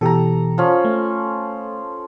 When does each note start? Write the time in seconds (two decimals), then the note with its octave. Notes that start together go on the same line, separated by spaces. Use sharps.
0.01 B2 E3 G4 A4 A#5
0.58 F3 C#4
0.85 A3